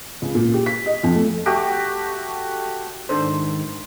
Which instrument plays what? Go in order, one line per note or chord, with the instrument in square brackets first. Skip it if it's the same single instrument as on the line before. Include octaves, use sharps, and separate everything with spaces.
[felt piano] C#2
A#2
G4
B6
D#5
F2
A3
[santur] A3 F#4 G4
[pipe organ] G#2 D#3 [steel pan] D4 A4 C5